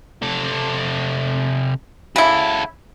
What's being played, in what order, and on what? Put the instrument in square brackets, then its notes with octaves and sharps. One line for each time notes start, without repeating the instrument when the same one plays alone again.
[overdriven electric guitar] C3 A4
[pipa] C#3 E4 [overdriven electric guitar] F#4 A4